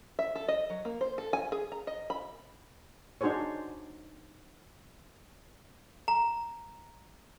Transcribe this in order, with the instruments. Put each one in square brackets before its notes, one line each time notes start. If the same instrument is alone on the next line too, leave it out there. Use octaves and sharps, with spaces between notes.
[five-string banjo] E5
A4
D#5
F#3
A#3
C5
A4
G#5
G#4
A#5
D#5
B5
[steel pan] D4 D#4 F#4 G#4 C5 C#5
[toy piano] A#5